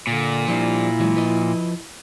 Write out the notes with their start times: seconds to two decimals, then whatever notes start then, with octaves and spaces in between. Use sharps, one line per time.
0.07 A#2 D3
0.48 F3 G3 D4 E4
1.00 E3 F#3 G#3
1.16 F3 B4 D#5